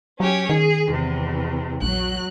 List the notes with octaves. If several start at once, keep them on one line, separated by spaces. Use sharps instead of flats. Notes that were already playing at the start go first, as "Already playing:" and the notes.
F#3 C#4 G4 C#5
D#3 G#4
E2 C3
A#1 F#3 F#6